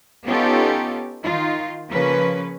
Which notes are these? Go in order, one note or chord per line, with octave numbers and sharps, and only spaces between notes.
B3 C#4 D#4 F4 G4 A4
D#3 D#4 F4
C#3 F3 A#3 C#4 B4